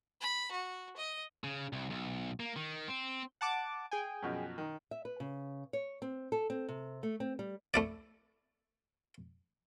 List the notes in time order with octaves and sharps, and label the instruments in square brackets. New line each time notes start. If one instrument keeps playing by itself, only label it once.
[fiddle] B5
F#4
D#5
[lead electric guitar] C#3
C2
B1
A#3
D#3
C4
[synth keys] F#5 A5 D6
G#4 G5 G#5
[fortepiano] F#2 B2 F3
D#3
[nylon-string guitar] E5
B4
C#3
C#5
C4
A4
C4
C3
A3
C4
G3
[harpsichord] A3 E4 D5